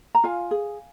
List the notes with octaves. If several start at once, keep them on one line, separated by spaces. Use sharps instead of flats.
A#5
F4 F5 G#5
G#4